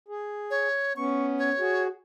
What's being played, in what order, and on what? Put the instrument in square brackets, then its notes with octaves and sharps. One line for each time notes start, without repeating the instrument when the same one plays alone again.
[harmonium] G#4
[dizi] C#5
[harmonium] B3 C#4 [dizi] C#6
[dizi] C#5
[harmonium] F#4 G#4